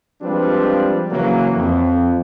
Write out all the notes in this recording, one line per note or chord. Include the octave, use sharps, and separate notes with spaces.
F3 G3 G#3 C4 D4 B4
C#3 E3 F#3 A#3
F2